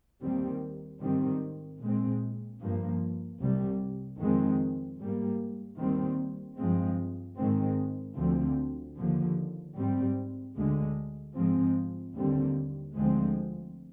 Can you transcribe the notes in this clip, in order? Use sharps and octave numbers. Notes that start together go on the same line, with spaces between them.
D#2 D#3 G3 C4
G#2 D#3 G3 C4
A#2 G#3 C4
G2 F3 A#3
C2 C3 G3
F2 D#3 G#3 C4
G#2 G3 A#3
D#2 D#3 G3 C4
G2 F3 G#3 C4
G#2 D#3 G#3 C4
D2 D3 F3 C4
D#2 D3 F3
G#2 G3 C4
D2 D3 G#3
G#2 F3 G#3 C4
D#2 D3 G3 C4
D2 D3 F3 G#3 C4